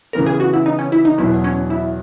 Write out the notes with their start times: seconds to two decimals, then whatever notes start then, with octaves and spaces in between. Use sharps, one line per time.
0.13 C#3 E3 B3 A#4
0.26 G#4
0.40 F#4
0.54 E4
0.66 D#4
0.79 C#4
0.92 E4
1.05 D#4
1.18 E2 B2 F#3 B3 E4
1.44 C#4
1.70 E4